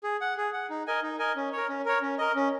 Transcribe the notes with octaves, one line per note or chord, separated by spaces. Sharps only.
G#4
F#5
G#4
F#5
D#4
A#4 D#5 G#5
D#4
A#4 D#5 G#5
C#4
A#4 C#5
C#4
A#4 C#5
C#4
A#4 D#5
C#4